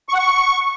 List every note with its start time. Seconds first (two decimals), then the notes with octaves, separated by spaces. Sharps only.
0.09 C#6
0.14 F#5
0.19 C#6